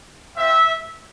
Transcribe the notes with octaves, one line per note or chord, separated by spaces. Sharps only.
C4 F4 E5